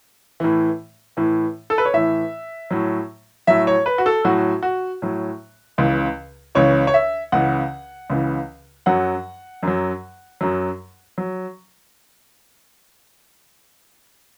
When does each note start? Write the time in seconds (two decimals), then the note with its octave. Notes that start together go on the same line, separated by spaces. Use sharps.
0.40 A2 E3
1.17 A2 E3
1.70 A4
1.78 B4
1.85 C#5
1.93 A2 E3 E5
2.71 A2 F#3
3.47 A2 F#3 E5
3.67 C#5
3.86 B4
3.98 F#4
4.06 A4
4.25 A2 F#3 F#4
4.63 F#4
5.02 A2 F#3
5.78 C#2 C#3 E3
6.55 C#2 C#3 E3 C#5
6.87 C#5
6.94 E5
7.32 C#2 C#3 E3 F#5
8.10 C#2 C#3 E3
8.86 F#2 F#3 F#5
9.63 F#2 F#3
10.41 F#2 F#3
11.18 F#3